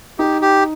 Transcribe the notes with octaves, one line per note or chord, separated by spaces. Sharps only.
D#4 G4
G4